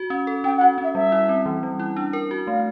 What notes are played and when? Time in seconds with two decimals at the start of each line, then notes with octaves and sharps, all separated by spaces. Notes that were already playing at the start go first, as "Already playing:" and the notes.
Already playing: F#4
0.10 C#4
0.27 A4
0.44 C#4 G5
0.57 F#5
0.61 F#4
0.78 C#4
0.83 E5
0.95 G3 E5
1.12 E4
1.29 C4
1.46 E3
1.63 G3
1.79 E4
1.96 D4
2.13 A#4
2.31 F#4
2.47 A3 F5